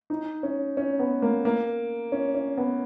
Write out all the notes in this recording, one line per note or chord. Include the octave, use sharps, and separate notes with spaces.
D#4
C#4
C#4
B3
A#3
A#3
C#4
C#4
B3